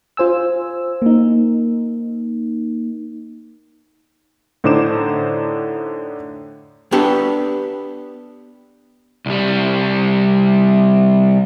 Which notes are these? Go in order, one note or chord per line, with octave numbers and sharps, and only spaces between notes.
F4 C5 G#5 E6
A#3 D#4
A2 D3 D#4 C5 D6 E7
B3 D4 G4 A4
C2 G3